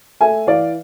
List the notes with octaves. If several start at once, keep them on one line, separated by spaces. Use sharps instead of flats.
A3 E5 G#5
E3 D5 F5